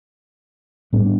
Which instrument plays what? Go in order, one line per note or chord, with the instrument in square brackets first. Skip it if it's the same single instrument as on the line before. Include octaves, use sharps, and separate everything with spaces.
[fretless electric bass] A2 G3 B3 D4